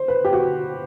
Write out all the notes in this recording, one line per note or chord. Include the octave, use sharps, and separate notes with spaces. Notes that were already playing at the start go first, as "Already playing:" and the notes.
Already playing: C5
B4
G4
F#4